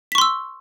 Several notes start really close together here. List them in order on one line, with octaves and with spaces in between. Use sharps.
B6 C#6 C6 E6